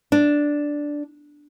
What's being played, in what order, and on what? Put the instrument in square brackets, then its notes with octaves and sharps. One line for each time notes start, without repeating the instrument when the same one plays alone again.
[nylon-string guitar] D4